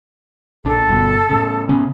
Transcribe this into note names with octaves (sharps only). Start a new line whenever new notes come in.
A#1 D4 A4
G1 G2 B2
A2 C#3
C#3 B3 C#4